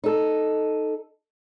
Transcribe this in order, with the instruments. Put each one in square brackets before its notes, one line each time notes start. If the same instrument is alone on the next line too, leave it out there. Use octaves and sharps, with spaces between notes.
[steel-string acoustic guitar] D#4 A4